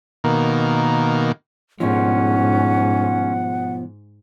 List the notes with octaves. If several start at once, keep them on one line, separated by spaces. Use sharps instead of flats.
B2 D#3 A#3
G#2 B2 F3 C#4 F#5